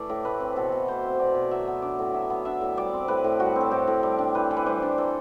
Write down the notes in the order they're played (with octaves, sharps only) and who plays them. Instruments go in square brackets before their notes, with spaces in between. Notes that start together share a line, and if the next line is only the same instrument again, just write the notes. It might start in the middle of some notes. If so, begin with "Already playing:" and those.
Already playing: [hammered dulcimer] E3 A3 D5
A2
A3 B4
C4
B2 A4
B2
A3 C5
C4
B2 D5
B2
F#3 E5
B3
D4 D5
A2
F#3 E5
B3
D4 E5
A2
G3 D5
C4
A2 B4
A2
G3 F#4
C4 A4
A2 G4
A2
G3
D4
E3 B4
E3
B4
G3 C5
D4
E3 A4